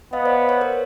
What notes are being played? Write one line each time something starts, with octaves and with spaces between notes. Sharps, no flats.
B3 D#5 F5
C5 D5
B4 C#5
A#4 C5